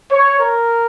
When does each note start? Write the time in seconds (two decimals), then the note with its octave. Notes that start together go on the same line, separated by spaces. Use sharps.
0.11 C#5
0.41 A#4